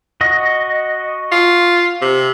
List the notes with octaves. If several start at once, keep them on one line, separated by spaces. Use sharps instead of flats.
F#4 D#5
F4
C3